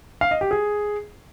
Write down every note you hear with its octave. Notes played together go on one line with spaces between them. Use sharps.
F5
D#5
G4
G#4